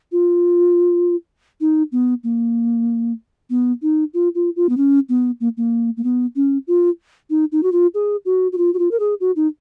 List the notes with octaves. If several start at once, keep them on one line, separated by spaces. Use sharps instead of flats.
F4
D#4
B3
A#3
B3
D#4
F4
F4
F4
B3
C#4
B3
A#3
A#3
A#3
B3
C#4
F4
D#4
D#4
F#4
F4
G#4
F#4
F#4
F4
F#4
F4
A#4
G#4
F#4
D#4